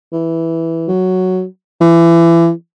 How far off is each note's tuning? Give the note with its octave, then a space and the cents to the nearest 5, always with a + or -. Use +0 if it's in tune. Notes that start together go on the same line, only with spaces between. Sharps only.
E3 -5
F#3 +0
E3 +30